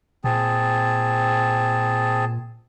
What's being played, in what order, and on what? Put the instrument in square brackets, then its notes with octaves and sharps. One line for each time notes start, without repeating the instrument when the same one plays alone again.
[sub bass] A#2 [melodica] C4 G#4 A5